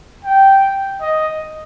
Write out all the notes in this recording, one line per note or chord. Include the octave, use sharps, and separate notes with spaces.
G5
D#5